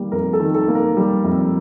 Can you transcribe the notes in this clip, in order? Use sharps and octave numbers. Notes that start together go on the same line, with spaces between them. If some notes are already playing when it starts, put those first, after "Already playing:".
Already playing: D#3 G3 A#3
F2 A#4
A4
D#3
A4
A#3
A#4
G3
F2